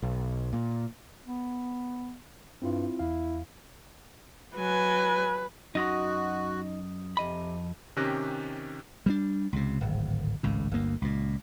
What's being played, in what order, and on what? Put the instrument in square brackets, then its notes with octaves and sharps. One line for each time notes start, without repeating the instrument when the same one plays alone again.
[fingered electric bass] B1
A#2
[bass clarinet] B3
[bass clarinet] G2 [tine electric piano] C4 E4 F4
[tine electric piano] E2 F5 [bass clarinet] E4
[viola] F#3 G#5 [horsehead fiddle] B4
[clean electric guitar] F#2 D#5 C6 [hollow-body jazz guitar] D#4 [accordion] F#4
[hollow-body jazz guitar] F2 D#5 B5 [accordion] C3
[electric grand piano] C3 D#3 C#4 G4 F#6 A#6
[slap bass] G3 G#3 D4
C#2 C3
D1 G#1
G#1 C#2 A2
G1 D2 A#3
C#2 A#2